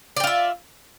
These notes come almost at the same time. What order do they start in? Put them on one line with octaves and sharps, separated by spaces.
D5 G5 F4 E5